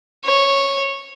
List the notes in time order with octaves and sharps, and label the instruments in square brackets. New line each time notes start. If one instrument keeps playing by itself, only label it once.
[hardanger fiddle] C#5